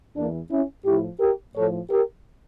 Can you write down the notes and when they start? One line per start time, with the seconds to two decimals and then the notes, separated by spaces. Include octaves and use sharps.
0.16 E2 E3 A#3 D4
0.50 C#4 E4
0.85 A2 F3 E4 G4
1.20 G4 A#4
1.55 A2 F3 A4 C#5
1.89 G4 A#4